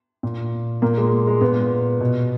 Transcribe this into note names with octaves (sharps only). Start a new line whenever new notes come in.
A#2
A#2 A#3
G#3
G#3
A#2 B3
B2